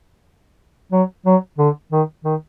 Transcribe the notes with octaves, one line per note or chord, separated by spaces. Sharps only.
F#3
F#3
D3
D#3
D#3